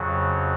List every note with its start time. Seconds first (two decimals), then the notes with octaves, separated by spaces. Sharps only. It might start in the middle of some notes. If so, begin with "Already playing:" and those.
Already playing: F2 C#3 F#3